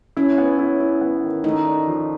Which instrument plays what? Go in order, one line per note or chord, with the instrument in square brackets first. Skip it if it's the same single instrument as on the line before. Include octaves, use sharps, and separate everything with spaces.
[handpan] C#4 [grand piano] E4
[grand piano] B3
E4
E4
B3
D#3
[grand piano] A3 [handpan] D#4
[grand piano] D4
F3